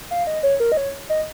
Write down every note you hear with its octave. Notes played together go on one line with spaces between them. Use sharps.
F5
D#5
C#5
A#4
D#5
C#5
D#5